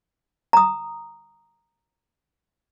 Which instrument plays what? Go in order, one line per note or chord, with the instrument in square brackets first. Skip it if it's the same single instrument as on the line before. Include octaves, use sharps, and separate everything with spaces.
[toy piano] A#5 D#6